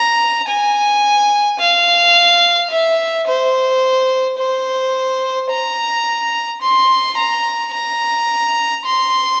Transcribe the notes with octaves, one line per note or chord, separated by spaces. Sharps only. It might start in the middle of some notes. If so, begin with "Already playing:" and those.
Already playing: A#5
G#5
F5
E5
C5
C5
A#5
C6
A#5
A#5
C6